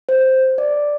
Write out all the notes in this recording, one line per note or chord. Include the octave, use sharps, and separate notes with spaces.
C5
D5